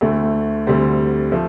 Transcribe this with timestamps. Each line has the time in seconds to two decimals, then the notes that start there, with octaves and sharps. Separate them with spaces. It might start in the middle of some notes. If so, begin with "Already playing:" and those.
0.01 D2 D3 A3
0.67 D2 D3 G3 C4
1.32 F3 A3